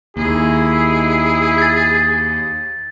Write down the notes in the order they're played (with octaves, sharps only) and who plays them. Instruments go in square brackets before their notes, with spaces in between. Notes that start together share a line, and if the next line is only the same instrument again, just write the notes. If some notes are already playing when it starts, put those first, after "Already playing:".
[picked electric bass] D#2 [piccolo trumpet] E4 [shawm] G#4
[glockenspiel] G#6 A6